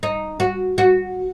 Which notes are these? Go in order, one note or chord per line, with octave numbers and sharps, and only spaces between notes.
D#4
F#4
F#4